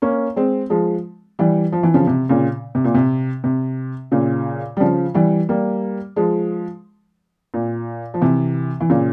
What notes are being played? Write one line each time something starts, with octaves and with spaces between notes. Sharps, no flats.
A#3 C#4
G#3 C4
F3 G#3
E3 G3
F3
E3
C#3 F3
C3
A#2 C#3
C3
A#2
C3
C3
A#2 C#3
G3
C#3 F3
E3 G3
G3 A#3
F3 G#3
A#2
F3
C3 E3
E3
A#2 C#3